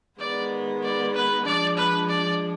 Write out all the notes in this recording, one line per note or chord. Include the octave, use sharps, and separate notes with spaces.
D#3 G#3 B3 D5
D5
B4
F3 G#3 D4 D5
B4
D5